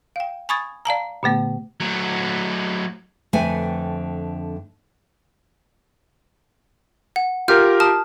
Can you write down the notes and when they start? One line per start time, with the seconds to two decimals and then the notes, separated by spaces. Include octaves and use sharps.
0.16 F5 G5
0.49 G#5 B5 C#6 D#6 G#6 A6
0.85 D5 F5 A5 A#5
1.23 A#2 D3 A3 B3
1.80 F#3 A3
3.33 F2 D3 A3 B4 G5 G#5
7.16 F#5
7.48 F4 G4 A#4 F6 G6
7.80 A5 D#6 F6